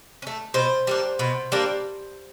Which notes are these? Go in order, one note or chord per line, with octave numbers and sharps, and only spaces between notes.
C#4
A3
B2 C5
G3 A#3 D4
B2
G3 A#3 D4